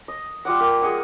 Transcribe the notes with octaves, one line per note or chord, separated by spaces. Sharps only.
D#5
G3 F4 D5 F#5
A#3 G4
G#4 D#5 F#5